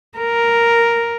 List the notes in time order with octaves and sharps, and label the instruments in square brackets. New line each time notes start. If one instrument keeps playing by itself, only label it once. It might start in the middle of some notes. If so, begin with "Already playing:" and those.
[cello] A#4